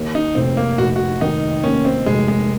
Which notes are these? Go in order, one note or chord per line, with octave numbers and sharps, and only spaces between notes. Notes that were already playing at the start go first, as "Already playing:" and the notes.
Already playing: D#2
D#4
F1 C4
A#3
F1 F#4
F#4
D#3 D#4
D#2 C#4
C4
F1 G#3
G#3